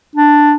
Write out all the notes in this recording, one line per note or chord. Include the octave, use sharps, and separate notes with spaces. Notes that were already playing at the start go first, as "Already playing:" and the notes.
D4